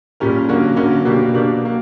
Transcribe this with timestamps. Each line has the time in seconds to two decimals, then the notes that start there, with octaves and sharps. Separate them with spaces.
0.20 A#2 G3 C#4 G4 A#4
0.49 F#2 D3 A#3 C#4 F#4
0.76 F#2 D3 A#3 C#4 F#4
1.05 B2 A#3 D4 G4
1.34 B2 A#3 D4 G4
1.63 F#3 A#3